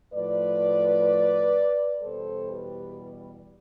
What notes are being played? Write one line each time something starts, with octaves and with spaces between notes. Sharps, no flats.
A2 F3 B4 D5
E2 B2 G3 A4 C5
G4 B4